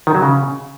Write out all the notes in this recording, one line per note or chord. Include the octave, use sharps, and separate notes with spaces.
D#3
F#3
C#3